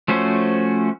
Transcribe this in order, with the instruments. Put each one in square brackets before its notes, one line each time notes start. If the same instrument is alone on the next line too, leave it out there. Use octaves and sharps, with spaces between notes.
[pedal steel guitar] F3 A3 C#4 F#4 C5